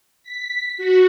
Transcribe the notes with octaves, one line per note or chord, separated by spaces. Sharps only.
B6
F#4